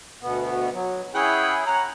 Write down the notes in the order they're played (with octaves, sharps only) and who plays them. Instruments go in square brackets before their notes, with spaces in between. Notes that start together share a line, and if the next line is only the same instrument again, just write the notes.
[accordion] D2 B2 B3
F#3
[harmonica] C#4 F#5 G5 [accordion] E4 G#4
[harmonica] C#4 F#5 A#5